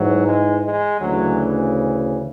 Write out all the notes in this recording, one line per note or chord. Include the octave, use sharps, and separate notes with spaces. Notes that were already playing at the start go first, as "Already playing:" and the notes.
Already playing: G#2 E3 F#3
G#3
G#3
D2 C#3 E3 F#3